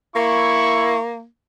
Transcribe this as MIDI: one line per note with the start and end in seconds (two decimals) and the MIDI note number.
0.16 1.26 58
0.16 0.97 64
0.16 0.97 85